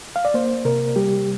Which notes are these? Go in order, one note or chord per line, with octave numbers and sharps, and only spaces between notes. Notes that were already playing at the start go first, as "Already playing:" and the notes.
F5
D5
A#3 C5
C3 A#4
G3 G4